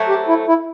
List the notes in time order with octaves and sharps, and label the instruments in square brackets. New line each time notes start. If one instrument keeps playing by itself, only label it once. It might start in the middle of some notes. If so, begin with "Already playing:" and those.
Already playing: [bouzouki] F#3 A3 C4
[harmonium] G4
E4
E4